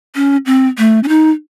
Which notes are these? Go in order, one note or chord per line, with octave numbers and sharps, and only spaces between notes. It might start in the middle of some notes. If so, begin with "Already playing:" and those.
C#4
C4
A3
C#4
D#4